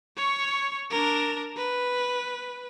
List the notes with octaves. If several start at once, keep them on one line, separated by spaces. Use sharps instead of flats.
C#5 C#6
D4 A#4
B4